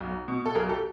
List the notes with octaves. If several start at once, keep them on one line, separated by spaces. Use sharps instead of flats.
B1
B2
A4
B1 G#4 A#4
G4 A4